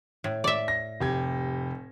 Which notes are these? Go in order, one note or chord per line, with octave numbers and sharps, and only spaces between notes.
A2
D5 E5
A#6
F1 G4 G#6